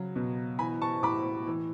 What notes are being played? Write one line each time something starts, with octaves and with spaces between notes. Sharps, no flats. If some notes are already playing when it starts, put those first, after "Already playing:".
Already playing: C#3 F#3
B2
E3 G#5 B5
A5 C#6
A2 B5 D6
E3